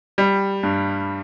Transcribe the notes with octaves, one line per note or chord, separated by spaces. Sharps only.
G3
G2